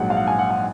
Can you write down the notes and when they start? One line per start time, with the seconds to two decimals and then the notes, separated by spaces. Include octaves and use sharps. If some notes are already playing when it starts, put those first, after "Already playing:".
Already playing: A#1 G#2 F#3 F#5
0.10 F5
0.17 F#5
0.27 G#5
0.39 F#5
0.50 F#5